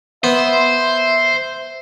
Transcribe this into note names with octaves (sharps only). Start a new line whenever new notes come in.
B3 C5 E5